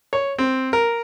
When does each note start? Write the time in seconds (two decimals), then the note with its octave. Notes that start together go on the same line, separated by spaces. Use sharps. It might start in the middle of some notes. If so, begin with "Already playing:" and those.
0.13 C#5
0.39 C4
0.73 A#4